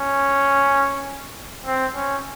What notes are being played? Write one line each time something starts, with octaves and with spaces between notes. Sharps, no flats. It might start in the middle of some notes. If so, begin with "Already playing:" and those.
Already playing: C#4
C4
C#4